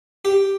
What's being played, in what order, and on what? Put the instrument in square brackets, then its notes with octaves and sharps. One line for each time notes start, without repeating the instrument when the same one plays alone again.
[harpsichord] G4